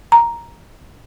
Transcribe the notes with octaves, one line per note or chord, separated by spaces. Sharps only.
A#5